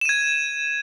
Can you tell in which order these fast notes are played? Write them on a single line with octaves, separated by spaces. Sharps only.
E7 D#7 G#6